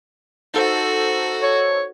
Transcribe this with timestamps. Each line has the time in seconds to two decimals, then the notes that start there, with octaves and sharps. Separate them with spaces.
0.54 D#4 F#4 A4 C5
1.43 C#5